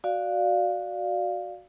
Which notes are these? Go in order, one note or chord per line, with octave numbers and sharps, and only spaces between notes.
F#4 D5 F5